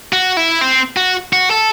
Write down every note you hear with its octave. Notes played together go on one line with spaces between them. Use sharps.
F#4
E4
C4
F#4
F#4
A4